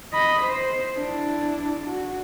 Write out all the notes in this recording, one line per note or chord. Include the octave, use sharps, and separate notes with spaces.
D#5 B5
C5
D4 E4
F#4